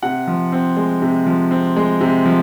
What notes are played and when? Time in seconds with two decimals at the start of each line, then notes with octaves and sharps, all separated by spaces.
0.02 C3 F#5
0.28 F3
0.52 C4
0.77 G#3
1.02 C3
1.26 F3
1.51 C4
1.76 G#3
2.01 C3
2.25 F3